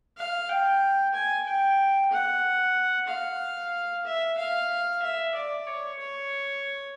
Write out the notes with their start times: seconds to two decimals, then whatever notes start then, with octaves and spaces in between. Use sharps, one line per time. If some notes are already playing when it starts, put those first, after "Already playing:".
0.17 F5
0.49 G5
1.14 G#5
1.46 G5
2.11 F#5
3.08 F5
4.05 E5
4.38 F5
5.02 E5
5.35 D5
5.66 C#5
5.98 C#5